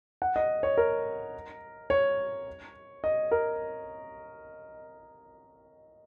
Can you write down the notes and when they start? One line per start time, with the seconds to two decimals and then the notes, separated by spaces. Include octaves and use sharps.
0.22 F#5
0.36 D#5
0.63 C#5
0.78 A#4
1.90 C#5
3.04 D#5
3.31 A#4